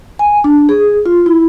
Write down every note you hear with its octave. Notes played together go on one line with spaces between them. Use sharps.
G#5
D4
G#4
F4
E4